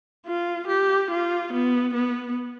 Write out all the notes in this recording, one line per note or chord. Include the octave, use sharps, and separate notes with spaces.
F4
G4
F4
B3
B3